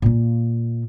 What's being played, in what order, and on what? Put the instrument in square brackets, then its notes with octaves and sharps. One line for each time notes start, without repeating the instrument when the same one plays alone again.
[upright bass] A#2 A#3